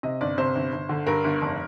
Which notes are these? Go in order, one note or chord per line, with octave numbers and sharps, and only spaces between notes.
C3 D#5
G1 D5
C3 C5
G1
G1
D3
G2 A#4
G1
F1